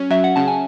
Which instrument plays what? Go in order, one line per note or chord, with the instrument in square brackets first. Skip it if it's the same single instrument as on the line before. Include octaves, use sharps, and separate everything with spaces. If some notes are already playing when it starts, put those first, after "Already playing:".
Already playing: [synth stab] F#3 C#4
[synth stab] F#3 [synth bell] E5
[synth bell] F#5
[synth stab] C#3 [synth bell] A5
[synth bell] G#5